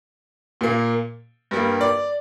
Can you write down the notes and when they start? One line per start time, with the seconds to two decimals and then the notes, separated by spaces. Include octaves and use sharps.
0.61 A#2 A#3
1.51 G2 G3 A#3
1.81 D5